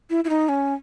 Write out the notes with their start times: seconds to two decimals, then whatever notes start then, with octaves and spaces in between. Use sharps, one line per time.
0.10 E4
0.24 E4
0.29 D#4
0.49 C#4